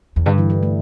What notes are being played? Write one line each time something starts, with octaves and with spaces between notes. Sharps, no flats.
E2
G2 D3
E3
G3
A3